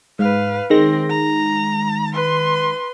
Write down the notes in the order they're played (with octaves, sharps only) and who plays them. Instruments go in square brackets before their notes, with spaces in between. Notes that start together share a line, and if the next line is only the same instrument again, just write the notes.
[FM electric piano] G#2 [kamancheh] B4 F5
[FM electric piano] D#3 G#3 A#6 [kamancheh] C4
[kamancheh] A#5
B4 C6